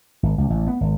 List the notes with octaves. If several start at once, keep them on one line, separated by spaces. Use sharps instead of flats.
G#1
C#2
A1
B3
G#1